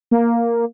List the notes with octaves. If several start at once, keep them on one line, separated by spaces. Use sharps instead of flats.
A#3